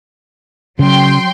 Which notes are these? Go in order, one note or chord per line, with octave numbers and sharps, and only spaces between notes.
C#3 F#3 G5 C6